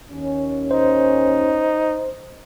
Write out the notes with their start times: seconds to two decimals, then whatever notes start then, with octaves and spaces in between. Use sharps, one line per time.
0.11 D#2 C#4
0.71 D#4 C5